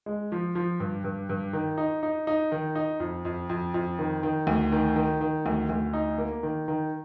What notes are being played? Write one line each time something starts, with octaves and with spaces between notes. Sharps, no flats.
G#3
F3
F3
G2
G2
G2
D#3
D#4
D#4
D#4
D#3
D#4
F2
F2
F2
F2
D#3
D#3
D2
D#3
D#3
D#3
D2
D2
D#4
A#3
D#3
D#3